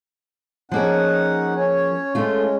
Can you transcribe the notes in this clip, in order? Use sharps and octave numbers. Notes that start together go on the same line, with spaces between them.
F3 A#3 C#4 D#4 G#4 F#5
C#4 C#5
G#3 A3 C#4 F4